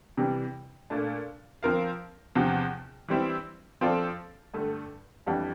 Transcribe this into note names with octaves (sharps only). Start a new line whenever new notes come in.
C3 E3 G3
A#2 A3 D4
F3 C4 F4 A#4 F5
E2 C3 F3
E3 G3 C4 E4
F3 C4 F4 A4 D5
G2 D3 A3
F2 E3 G3 D4